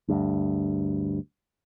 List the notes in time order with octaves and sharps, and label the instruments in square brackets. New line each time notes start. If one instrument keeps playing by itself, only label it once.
[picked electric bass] D2 G2